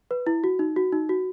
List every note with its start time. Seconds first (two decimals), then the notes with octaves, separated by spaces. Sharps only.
0.11 B4
0.27 E4
0.44 F#4
0.59 D#4
0.76 F#4
0.92 D#4
1.09 F#4